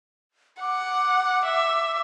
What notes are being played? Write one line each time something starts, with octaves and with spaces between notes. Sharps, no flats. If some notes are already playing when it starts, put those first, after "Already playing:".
F#5 D6
E5